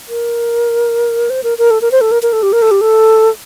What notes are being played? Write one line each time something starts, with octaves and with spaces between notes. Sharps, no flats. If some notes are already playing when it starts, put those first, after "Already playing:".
A#4
C5
A#4
A#4
A4
A#4
C5
A4
A#4
A#4
A4
G4
A#4
A4
G4
A4